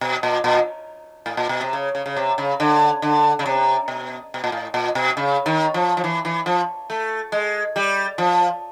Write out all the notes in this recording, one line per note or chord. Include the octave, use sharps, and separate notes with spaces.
B2
A#2
A#2
A2
A#2
B2
C3
C#3
C#3
C#3
C3
C#3
D3
D3
C#3
C3
B2
B2
A#2
A2
A#2
B2
C#3
D#3
F3
F3
E3
E3
F3
A3
G#3
G3
F3